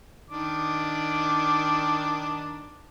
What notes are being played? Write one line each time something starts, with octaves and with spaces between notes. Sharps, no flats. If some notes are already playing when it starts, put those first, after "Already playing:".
D#3 D4 D6